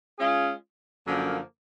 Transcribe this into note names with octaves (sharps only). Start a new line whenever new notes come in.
G#3 C#4 F4 G#4
F#2 D3 F3 A#3